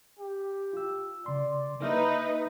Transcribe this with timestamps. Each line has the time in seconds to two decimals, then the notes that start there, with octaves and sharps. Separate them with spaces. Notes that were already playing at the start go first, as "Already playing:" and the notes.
0.19 G4
0.73 F4 E6
1.26 C#3 D5 C6
1.82 A#3 D#4 B4 D#5 E5 F6